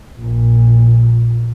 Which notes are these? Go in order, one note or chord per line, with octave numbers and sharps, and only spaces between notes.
A#1 A#2